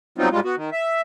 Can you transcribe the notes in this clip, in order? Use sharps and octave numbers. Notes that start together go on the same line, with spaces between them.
F#3 G3 B3 C4 D#4 F4
G#2 G3 G#3 F4
B3 F#4
D#3
E5